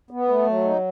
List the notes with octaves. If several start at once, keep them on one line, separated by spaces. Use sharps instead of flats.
B3
A3
F#3
D#4